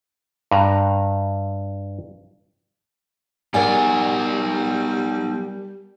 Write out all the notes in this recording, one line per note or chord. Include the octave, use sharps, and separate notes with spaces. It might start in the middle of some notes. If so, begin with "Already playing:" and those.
G2 A#5
G3 B3 D#4 A#4 D5 F#5 G#5